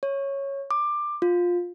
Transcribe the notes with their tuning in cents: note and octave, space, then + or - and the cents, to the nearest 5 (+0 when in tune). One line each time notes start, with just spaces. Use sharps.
C#5 -5
D6 +15
F4 +15